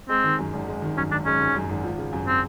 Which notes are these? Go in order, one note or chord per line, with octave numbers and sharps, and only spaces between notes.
G#3 C4
D#3
F#2
G#1
G#3
D#3
F#2 C#4
G#1 D4
G#3 C#4
D#3
F#2
G#1
F3
C#3
F#2
C4